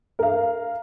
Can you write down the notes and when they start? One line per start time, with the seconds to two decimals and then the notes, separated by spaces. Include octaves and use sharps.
0.19 A#4 F5